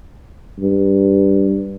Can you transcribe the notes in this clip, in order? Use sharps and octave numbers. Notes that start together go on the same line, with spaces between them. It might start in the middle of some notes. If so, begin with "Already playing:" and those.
G2